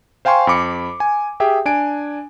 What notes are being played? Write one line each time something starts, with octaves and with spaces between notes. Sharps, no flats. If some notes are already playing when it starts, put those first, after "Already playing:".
C5 F5 G5 G#5 C6 C#6
F2 B5 D6 C#7
G#5
G4 G#4 E5 G5
D4 G#5 D7